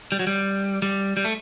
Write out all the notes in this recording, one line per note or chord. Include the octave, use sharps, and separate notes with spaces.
G3
F#3
G3
G3
G3
A3